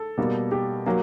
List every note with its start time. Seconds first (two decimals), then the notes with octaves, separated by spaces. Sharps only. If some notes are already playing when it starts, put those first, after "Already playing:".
Already playing: A4
0.18 B2 G3 A#3
0.52 G4
0.86 F#3 A#3